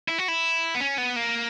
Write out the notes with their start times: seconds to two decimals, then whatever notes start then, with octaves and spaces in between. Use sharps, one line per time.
0.08 E4
0.18 F#4
0.28 E4
0.75 B3
0.81 C#4
0.98 B3
1.16 A#3